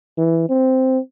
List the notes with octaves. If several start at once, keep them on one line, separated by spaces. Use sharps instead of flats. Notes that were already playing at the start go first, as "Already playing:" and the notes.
E3
C4